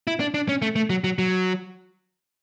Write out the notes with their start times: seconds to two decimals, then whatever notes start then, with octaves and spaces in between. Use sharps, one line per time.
0.07 E4
0.20 D4
0.34 D4
0.49 C#4
0.62 A3
0.76 A3
0.90 F#3
1.04 F#3
1.19 F#3